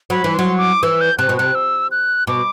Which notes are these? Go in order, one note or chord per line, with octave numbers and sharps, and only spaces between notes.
F#3 B5
E3
F#3 C6
D6
E3 E6
G6
C3 F#6
B2
C3 F#6
E6
F#6
B2 D6